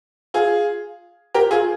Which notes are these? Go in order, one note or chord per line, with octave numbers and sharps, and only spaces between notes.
F4 G#4
G4 A#4
F4 G#4